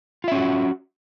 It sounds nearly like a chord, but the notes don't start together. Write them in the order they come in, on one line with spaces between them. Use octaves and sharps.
F4 E5 C#4 F#4